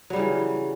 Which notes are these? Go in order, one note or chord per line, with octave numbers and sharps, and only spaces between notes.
C#3 E3 F#3 G3